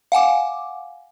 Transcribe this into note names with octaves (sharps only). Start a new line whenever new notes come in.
F5 F#5 G#5 D6